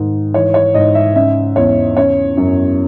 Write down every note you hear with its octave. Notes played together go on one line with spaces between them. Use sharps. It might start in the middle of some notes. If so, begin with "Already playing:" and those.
Already playing: G#2 D#3
E3 C#5
C#5
G#2 D#5
E5
C#3 E5
E2 C#5
C#3 C#5
F#2